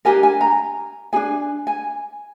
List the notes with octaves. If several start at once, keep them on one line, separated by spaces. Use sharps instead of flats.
D4 G4 A#4 G#5
G#5
A#5
D4 G#4 G#5
G#5